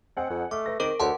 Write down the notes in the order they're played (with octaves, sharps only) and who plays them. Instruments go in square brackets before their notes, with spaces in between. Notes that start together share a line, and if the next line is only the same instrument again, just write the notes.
[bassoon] C4 [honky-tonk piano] D#5 F#5 G#5
[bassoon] F2
[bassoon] A3 [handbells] D6 [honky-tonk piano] F6
[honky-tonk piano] B4 A#6
[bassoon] D#3 [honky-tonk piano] C4 D7 [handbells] G#4 A#4 D6
[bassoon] D2 [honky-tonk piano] A4 B4 C#5 [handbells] F#5 A5 C6